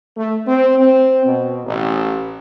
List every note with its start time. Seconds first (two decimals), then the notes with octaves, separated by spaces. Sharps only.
0.17 A3
0.47 C4
0.78 C4
1.25 B2
1.65 A1